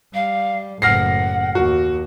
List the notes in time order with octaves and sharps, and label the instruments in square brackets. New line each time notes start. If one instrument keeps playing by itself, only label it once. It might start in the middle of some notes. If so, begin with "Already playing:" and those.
[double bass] G3 [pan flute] F5
[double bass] F#1 A2 [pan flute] F#5 [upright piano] F6 A#6 C7
[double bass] D#2 [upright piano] F#4